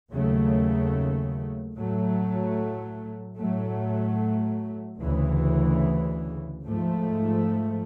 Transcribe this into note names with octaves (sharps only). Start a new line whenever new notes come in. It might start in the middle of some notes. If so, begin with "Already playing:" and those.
D#2 C#3 F#3 A3
A2 F#3 A3
A2 F#3 A3
D2 C#3 E3
G#2 F3 A3